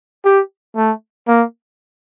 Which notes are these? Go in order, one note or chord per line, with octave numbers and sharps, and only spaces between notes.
G4
A3
A#3